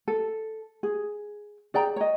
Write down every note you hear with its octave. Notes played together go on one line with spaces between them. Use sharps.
A4
G#4
G#4 D5 G5 A#5
C#5 D#5